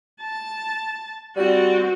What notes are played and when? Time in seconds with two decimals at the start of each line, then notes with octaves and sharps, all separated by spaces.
0.20 A5
1.36 G3 C4 F#4